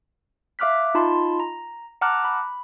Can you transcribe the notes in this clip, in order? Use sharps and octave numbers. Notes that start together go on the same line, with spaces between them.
E5 F5 D6 F6 F#6 B6
D#4 F4 A5 B5 C6
A#5
F#5 A5 A#5 D6 F6 F#6
B5